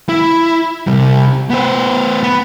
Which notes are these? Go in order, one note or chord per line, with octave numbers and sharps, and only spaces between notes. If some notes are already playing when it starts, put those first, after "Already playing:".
E4
C3 G3
B3 C5
B3